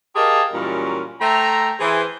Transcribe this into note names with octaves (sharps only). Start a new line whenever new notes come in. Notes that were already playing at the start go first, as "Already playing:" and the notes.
G4 G#4 A#4 D#5 F5 A5
F#2 A#2 E3 G3 C#4 A#4
A3 C5 E5 G5 A#5
E3 G#4 C5